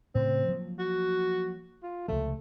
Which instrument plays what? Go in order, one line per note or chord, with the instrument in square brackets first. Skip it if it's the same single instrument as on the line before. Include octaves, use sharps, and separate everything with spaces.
[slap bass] A2 C#3 [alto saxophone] C4
[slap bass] F3 F#3 A#3
[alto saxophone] F#4
F4
[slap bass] C#2 C3 F3 [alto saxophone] A3